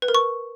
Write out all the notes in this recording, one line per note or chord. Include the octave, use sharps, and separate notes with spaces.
B4
A#4
C#6